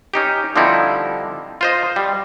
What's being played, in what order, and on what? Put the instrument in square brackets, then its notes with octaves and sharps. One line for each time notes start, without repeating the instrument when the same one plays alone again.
[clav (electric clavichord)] C#4 D#4 G4
D3 F3 G3 C4 D#4 E4
F4 C5 D#5
G3